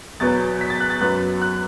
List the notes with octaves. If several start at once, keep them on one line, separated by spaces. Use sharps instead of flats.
E2 B2 F#3 B3 A6
B6
A6
F#6
A6
F#2 F#3 B3 F#6
F#6